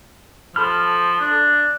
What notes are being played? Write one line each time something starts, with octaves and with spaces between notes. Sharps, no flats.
F3 A4 B5 F6
D4